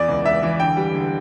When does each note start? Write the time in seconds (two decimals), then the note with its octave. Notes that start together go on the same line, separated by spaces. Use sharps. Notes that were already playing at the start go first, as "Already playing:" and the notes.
Already playing: E2 E3 D5
0.08 C#2
0.25 C#2 E5
0.43 E3
0.60 D3 G5
0.77 G3
0.94 D3